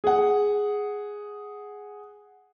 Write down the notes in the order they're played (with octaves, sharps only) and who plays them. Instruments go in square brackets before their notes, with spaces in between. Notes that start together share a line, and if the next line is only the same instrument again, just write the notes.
[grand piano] G#4 F#5